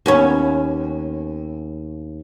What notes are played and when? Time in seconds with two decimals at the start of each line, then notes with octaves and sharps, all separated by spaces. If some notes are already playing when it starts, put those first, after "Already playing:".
0.06 D#2 B3 C#4